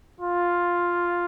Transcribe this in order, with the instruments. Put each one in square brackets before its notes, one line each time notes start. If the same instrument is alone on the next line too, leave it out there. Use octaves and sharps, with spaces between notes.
[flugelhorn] F4